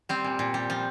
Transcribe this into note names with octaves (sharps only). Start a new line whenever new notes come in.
G3 C4
A#2
A#2
G3
F3